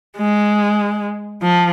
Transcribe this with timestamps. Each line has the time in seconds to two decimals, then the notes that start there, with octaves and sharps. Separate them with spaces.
0.17 G#3
1.42 F3